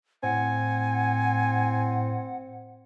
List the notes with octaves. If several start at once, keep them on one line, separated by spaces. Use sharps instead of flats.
A2 C4 F#5 G#5